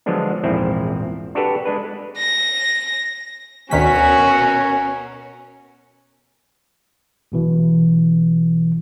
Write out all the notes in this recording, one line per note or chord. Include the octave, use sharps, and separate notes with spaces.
D3 F3 F#3 G#3 B3 D4
A#1 E2 G#2 F3 C4 E4
D4 F#4 G4 A4 B4
G#3 D4 B4
A#6
D2 B2 D#3 C#4 F#4 A#4 G#5 B6
B1 B2 E3